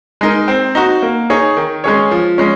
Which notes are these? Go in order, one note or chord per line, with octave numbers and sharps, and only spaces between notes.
G#3 D#4 A#4
C4
D#4 F#4
A#3
D#4 G#4 C#5
D#3
G#3 C#4 G#4 C#5
F3
G#3 C#4